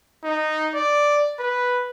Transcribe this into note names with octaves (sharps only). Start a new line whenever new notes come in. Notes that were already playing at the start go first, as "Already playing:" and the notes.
D#4
D5
B4